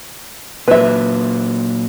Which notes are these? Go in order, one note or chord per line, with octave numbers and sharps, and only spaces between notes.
A#2 F#3 B4 E5